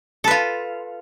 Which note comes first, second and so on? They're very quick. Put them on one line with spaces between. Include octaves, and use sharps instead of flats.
A4 B4 F4